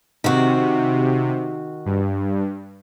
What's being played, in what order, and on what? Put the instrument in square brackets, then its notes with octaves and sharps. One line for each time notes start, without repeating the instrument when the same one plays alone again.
[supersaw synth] C3 [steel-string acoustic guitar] D#3 F#4
[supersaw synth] G2